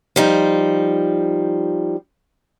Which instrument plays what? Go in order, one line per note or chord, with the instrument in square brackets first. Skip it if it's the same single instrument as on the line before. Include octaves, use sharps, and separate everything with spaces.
[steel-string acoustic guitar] F3 G3 D#4